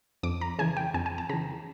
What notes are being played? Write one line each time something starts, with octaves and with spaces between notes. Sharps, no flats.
F2 D6
A#5
C#3 E3 G#5
G5
F2 G#5
G#5
A5
C#3 E3 A#5